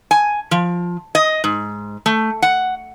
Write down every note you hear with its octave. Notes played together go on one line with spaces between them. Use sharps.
G#5
F3
D#5
G#2
A3
F#5